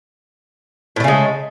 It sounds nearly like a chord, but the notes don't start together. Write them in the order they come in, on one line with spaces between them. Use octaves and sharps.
A2 A3 C#3 G#3